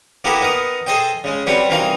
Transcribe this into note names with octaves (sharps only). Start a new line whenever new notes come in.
A#3 B3 E4 G4 A4 A#4
B3 D#4 A#4
G#4 A4 C5 D#5 G5
C#3 G#3
F#3 G3 C4 B4 C#5
C2 E3 C4 D#4 A#4 F5